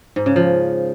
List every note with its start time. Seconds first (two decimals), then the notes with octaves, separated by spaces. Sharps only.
0.16 G#2
0.26 C#3
0.36 F3